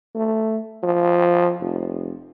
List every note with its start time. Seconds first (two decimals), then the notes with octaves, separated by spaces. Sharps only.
0.15 A3
0.83 F3
1.60 F1